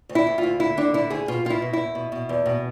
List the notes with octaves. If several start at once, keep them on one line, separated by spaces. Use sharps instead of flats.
D2
E4
D2
F4
D2
D3 E4
D3 D4
D3 E4
D2 G#4
B2 F4
B2 F4
E4
B2
E2 E4
B2
B2
E2
B2